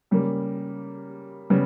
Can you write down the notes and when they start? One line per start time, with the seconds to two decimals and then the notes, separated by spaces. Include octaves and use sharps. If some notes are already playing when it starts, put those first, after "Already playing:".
0.11 C#3 G3 A#3
1.50 C#3 G3 B3